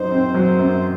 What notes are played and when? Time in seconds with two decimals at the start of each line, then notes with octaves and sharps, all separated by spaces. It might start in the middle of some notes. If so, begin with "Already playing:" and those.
Already playing: F#2 F#3 D#4 C5
0.11 C4
0.34 F#3
0.58 F#2